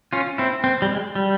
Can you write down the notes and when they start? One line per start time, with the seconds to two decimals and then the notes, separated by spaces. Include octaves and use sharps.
0.13 C#4 F4
0.38 C4 E4
0.64 C4
0.82 G3
0.89 G#3
1.15 G3